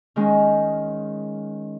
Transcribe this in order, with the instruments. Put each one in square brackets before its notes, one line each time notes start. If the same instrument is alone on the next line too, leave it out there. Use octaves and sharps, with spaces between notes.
[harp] D#3 G#3 C#4